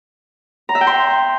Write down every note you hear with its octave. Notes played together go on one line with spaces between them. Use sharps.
A#5
E5
G5
C6